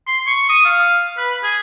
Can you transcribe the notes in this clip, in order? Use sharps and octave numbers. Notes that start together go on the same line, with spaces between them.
C6
C#6
D#6
F5
B4
G#4